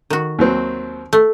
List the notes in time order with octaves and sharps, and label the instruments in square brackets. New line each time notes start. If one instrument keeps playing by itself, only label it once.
[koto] D#3 F#4
[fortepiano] D#2 F#3 C4
[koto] A3